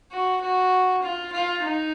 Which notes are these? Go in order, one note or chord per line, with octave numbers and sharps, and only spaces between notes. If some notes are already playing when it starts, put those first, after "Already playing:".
F#4
F#4
F4
F4
D#4